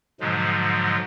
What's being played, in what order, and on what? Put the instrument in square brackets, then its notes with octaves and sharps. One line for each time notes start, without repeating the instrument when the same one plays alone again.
[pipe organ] G#2 B2 D3 F3 F#3 G#3